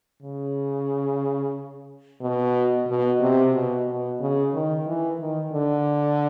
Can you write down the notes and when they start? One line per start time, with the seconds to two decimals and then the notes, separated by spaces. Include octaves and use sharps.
0.22 C#3
2.21 B2
2.88 B2
3.21 C3
3.54 B2
3.87 B2
4.20 C#3
4.54 D#3
4.86 E3
5.20 D#3
5.53 D3